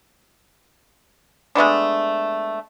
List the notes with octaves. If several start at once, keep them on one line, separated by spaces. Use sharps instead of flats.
G#3 A3 B3 D4